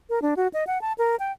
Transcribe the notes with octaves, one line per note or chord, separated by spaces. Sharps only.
A#4
D4
F#4
D#5
F#5
A5
A#4
G5